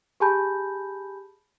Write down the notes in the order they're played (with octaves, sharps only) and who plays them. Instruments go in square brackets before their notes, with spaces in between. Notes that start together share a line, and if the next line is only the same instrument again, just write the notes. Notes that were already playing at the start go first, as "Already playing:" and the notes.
[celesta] G4 G#4 G#5 A5 B5 G6